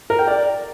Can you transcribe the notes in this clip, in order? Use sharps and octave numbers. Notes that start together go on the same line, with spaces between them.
A#4
G5
D5